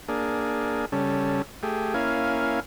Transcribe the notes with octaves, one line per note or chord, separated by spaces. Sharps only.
A#3 D4 G#4
C#3 G3 C#4 A4
A3 G4 G#4
A#3 C#4 E4 F5 G#5